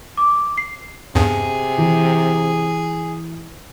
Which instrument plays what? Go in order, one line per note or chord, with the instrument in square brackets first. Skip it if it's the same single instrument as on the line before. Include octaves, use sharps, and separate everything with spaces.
[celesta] D6
C7
[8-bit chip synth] E2 G2 [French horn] C3 [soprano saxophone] G#4
[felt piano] E3